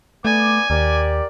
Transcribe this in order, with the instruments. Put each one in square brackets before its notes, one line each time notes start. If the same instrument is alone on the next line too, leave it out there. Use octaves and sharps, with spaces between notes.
[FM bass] A3 [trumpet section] B3 D5 D6 [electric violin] G#5
[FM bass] D#2 [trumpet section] G4 A#4 D5